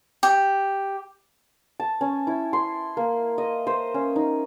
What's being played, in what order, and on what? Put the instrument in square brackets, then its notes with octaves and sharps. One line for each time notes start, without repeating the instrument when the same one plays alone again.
[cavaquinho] G4
[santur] A5
C#4
E4
C6
A#3
D#5
C5
C#4
D#4